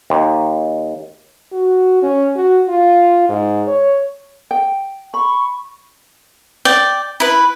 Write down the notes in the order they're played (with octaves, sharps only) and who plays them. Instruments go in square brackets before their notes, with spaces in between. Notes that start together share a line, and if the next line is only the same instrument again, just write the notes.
[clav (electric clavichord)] D#2
[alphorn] F#4
C#4
F#4
F4
G#2
C#5
[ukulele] G5
[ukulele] B5 [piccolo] C#6
[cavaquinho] D5 G5
E4 B4